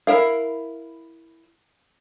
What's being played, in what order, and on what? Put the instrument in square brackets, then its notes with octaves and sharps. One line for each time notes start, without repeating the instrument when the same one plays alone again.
[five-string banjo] E4 A#4 F5